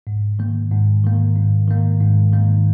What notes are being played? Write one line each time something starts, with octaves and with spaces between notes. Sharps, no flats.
G#2
D#3 A#3
G#2
D#3 A#3
G#2
D#3 A#3
G#2
D#3 A#3